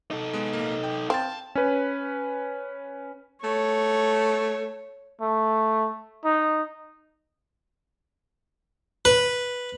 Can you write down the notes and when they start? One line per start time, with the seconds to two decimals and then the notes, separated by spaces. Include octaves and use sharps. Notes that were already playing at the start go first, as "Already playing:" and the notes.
0.11 D#4 A4
0.33 G#3 B3
0.53 A#1 A#3
0.84 G5
1.10 C4 F5 G5 A5 A6
1.55 C#4 B4
3.43 A3 C#5
5.21 A3
6.25 D#4
9.05 B4